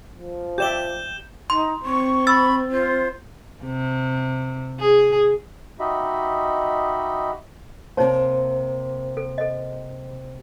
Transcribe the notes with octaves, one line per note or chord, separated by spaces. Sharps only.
F3
G4 D5 E5 G6 E7 G7
D#4 C6
C4 C#6
B5 E6 A6
F4 C5
C3
G#4
D#4 F#4 G4 D#5 E5 B5
C3 A#3 D#4 C5 C#5 A5
A4
A4 D#5